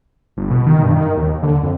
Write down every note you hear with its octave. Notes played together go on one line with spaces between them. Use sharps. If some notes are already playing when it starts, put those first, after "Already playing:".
G1
B2
D#3
G2
D#3
D#2
D3
F2